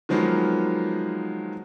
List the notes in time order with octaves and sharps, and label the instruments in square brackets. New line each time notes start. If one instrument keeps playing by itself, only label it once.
[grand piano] D#3 F3 F#3 G#3 A#3 B3